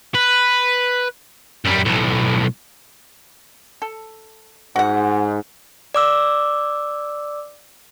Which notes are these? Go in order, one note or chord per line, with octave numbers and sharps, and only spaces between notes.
B4
F#2 G3
B1 A2
A4
G#2 F#4 F#5
D5 D6 E6